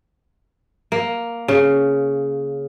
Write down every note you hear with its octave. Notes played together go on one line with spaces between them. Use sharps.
A#3
C#3